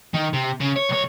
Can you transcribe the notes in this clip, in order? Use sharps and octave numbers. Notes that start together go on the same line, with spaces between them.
D#3
C3
C#3
C#5
B1 C#5